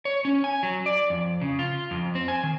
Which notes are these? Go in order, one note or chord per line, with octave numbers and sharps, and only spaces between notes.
C#5
C#4
G#5
F#3
D5
F2
C#3
F4
F2
C4
G#5
D#3